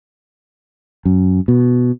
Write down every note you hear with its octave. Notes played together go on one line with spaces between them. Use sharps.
F#2
B2